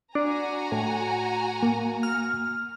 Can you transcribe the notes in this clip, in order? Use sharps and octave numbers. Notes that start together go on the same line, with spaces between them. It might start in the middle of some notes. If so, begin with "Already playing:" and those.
D4 F#4 G#5 A#5
A2
A#3
F6